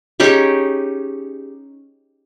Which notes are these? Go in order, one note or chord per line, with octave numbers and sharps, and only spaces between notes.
C#4 D#4 G4 G#4